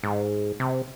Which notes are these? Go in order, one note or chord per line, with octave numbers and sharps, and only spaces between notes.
G#2
C3